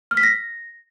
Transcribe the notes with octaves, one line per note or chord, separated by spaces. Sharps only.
F6
B6
A#6